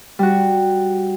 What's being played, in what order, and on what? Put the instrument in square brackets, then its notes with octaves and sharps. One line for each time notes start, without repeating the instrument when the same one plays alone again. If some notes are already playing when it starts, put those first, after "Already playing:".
[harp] G3 F#4